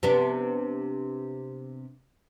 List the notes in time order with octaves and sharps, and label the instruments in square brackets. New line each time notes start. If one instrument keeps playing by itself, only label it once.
[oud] C3 B3 D4